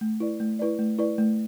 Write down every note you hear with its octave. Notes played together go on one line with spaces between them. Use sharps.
A3
E4 B4 D5
A3
E4 B4 D5
A3
E4 B4 D5
A3